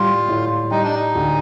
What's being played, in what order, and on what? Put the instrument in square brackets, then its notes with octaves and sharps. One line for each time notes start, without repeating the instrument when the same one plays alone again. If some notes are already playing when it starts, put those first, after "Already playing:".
Already playing: [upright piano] A2 G3 [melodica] F4
[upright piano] A2
[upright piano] G3 [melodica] D#4
[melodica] D4
D#4
[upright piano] D2